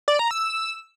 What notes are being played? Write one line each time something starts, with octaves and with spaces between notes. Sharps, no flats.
D5
A#5
E6